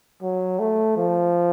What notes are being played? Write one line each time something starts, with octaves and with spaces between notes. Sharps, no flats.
F#3
A3
F3